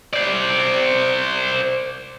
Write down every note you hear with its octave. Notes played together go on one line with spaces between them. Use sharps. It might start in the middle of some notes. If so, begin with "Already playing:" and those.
C5 D5